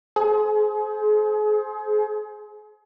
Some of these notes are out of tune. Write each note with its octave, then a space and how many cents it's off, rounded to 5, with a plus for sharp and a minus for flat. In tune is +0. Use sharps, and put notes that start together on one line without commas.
G#4 +30 C5 +0